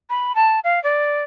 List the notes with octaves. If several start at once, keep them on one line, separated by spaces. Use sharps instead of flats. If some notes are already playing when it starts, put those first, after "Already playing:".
B5
A5
F5
D5